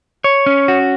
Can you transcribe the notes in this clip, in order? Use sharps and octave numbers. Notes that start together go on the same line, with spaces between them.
C#5
C#4
F#4